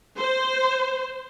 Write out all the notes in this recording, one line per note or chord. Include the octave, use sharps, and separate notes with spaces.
C5